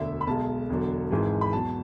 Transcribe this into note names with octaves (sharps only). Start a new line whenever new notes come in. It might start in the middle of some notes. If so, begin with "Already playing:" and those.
Already playing: E1 D2 D3 E5
B5
B1 B2 G#3 A5
E1 E2 D3 F#3
G#1 G#2 E3 G#3
B5
E2 B2 F#3 A5